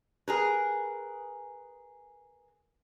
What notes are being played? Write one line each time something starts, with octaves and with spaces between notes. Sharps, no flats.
G#4 A#4 B4